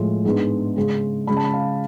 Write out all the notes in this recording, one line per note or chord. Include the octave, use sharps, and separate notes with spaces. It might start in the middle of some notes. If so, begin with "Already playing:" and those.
Already playing: A2 F3 G#3
G#2 G#3 B3 D4
C#3 G#3 C#4
C#3 G#3 C#4 B5
A5
B5
F5